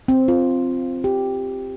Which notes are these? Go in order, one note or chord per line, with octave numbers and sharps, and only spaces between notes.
C4
F4
G4